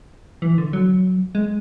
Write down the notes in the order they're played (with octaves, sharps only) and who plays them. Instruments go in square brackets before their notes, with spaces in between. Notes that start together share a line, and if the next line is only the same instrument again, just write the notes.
[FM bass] E3
D3
F#3
G#3